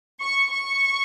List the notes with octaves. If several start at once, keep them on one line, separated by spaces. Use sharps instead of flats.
C#6
C#6